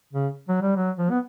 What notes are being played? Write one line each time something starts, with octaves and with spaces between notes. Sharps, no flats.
C#3
F#3
G3
F#3
F3
B3